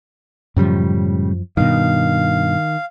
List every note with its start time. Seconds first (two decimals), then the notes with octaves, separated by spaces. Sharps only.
0.57 F#2 A2 C#3 F3 G3
1.57 G2 B2 D#3 F5